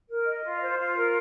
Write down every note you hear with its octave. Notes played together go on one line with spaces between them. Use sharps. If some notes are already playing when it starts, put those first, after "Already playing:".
A#4
D#5
F4
C5
F4
A#4